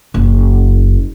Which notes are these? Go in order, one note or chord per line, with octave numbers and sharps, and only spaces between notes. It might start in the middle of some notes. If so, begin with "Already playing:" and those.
F#1